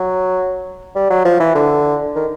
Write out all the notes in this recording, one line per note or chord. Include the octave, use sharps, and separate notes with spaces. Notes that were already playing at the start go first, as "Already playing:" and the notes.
Already playing: F#3
G3
F#3
F3
E3
D3
D#3